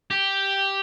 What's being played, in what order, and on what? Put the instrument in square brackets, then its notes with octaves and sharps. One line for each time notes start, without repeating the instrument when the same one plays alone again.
[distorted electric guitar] G4